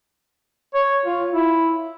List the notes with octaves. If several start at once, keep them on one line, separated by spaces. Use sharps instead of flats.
C#5
F4
E4